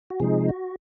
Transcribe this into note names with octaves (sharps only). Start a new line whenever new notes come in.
F#4
C3 F3 G#3 D#4 G#4
F#4